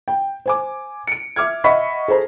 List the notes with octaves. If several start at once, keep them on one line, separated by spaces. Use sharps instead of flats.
G5
C5 G#5 D6
C#7 D7
E5 D6 F6 G#6
D#5 E5 F#5 B5 C#6 B6
G#4 A4 C5 A#5